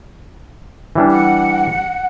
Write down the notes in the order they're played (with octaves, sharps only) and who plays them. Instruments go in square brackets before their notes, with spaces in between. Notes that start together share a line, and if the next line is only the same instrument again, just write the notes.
[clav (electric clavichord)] E3 G3 D4
[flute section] F#5